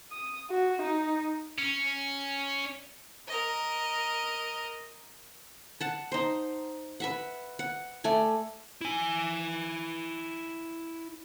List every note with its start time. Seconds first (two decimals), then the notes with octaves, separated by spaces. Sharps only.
0.12 D#6
0.50 F#4
0.82 D#4
1.58 C#4
3.28 A#4 D#5
5.81 F#5 A5
6.12 D#4 C5
7.00 B4 E5 F#5
7.59 F#5
8.04 A3 D5 G#5
8.81 E4 G#5